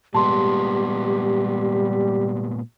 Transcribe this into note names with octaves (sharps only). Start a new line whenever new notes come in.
A#2 G3 G#3 B3 G4 A5 C6